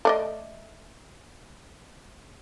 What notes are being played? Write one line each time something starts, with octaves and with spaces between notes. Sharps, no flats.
A3 D5 D#5